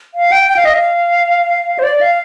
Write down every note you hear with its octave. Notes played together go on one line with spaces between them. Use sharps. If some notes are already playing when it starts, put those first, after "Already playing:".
F5
G5
G5
F5
D#5
F5
C5
D5
F5